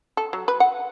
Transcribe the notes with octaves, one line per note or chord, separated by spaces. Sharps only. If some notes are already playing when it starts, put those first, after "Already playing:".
A4
F#3
B4
F#5